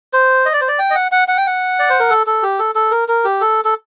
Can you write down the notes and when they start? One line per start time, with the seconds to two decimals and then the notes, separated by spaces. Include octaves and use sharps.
0.13 C5
0.46 D#5
0.53 D5
0.61 C5
0.68 D5
0.79 G5
0.90 D#5
0.95 F#5
1.12 F#5
1.28 F#5
1.37 G5
1.47 F#5
1.79 D5
1.90 C5
2.00 A#4
2.10 A4
2.27 A4
2.43 G4
2.59 A4
2.75 A4
2.91 A#4
3.08 A#4
3.25 G4
3.41 A4
3.65 A4